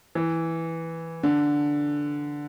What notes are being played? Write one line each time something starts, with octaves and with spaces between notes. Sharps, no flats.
E3
D3